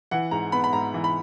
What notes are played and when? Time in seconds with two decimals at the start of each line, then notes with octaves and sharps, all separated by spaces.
0.11 E3 F#5
0.31 G#2 A#5
0.52 B3 B5
0.64 B5
0.73 G#2 A#5
0.94 E3
1.04 B5